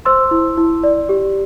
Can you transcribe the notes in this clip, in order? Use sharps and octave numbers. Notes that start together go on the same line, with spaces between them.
C5 C6 E6
E4
E4
D5
G4